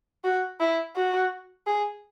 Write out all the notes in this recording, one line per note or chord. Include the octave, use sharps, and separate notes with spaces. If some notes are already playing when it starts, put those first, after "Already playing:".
F#4
E4
F#4
G#4